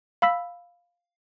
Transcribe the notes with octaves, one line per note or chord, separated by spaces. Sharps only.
F5 B5 E6 B6